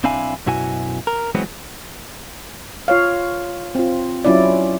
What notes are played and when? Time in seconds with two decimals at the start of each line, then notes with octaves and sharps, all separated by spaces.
0.04 B1 C4 D4 E4 F5 G#5
0.46 F#2 B2 E4 F#4 G#5
1.07 A#4
1.35 E3 F#3 G#3 B3 C4 F#4
2.88 F4 C#5 F5
3.75 C4 F4
4.25 F#3 C#4 E4 F4 D5